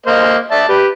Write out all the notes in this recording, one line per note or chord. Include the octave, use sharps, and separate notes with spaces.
A#3 C5 D#5
D5 E5 A5
G4 B4